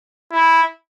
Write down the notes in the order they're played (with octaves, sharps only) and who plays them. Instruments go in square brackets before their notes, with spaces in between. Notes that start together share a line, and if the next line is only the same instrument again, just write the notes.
[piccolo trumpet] E4